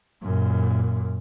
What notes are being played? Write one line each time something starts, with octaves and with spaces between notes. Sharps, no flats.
F#2 A#2